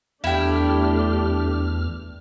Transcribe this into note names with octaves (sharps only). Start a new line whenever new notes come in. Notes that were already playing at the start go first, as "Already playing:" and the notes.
E2 A3 D4 E4 G4 G5 F6